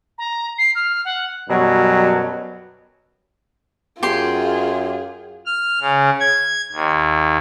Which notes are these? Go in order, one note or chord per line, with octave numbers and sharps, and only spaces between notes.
A#5
C7
F6
F#5
F#2 B2 F#3 G3
F#2 F4 G4 G#4 C6
F6
C#3
G#6
D#2